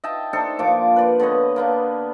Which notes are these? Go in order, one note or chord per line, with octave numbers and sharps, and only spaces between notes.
D#5 E5 G5 A5
D4 D#4 A4 C5
A#2 F3 D6
B4 D5 C6
D3 B3 C#5 D#5
A#3 B3 D4